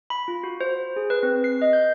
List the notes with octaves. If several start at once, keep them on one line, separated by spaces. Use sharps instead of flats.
B5
F4
F#4
C5
G#4
B4
C4
C7
D#5
G6